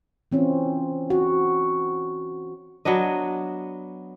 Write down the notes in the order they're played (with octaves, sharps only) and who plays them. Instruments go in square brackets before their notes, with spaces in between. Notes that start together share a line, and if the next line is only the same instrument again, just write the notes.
[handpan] E3 C4 C#4 F4
F#4
[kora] F#3 B3 D4 D#5